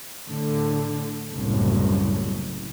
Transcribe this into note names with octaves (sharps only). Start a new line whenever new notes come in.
A2 D3
F#1 C2 F#2 A2